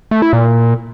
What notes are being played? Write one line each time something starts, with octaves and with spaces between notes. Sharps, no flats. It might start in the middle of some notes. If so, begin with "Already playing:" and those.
A3
E4
A#2